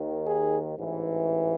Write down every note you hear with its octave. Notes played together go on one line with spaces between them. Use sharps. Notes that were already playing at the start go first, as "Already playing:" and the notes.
Already playing: D#2 D#3
G#4
A1 G#2 E3